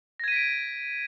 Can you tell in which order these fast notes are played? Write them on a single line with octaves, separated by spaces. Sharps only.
A#6 G#6 D#7 B6 D7